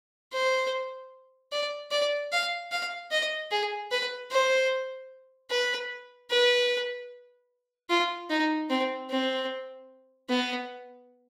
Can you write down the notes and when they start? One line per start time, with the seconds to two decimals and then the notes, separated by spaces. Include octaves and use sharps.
0.32 C5
1.52 D5
1.91 D5
2.32 F5
2.72 F5
3.11 D#5
3.51 G#4
3.91 B4
4.31 C5
5.50 B4
6.30 B4
7.89 F4
8.30 D#4
8.69 C4
9.10 C4
10.29 B3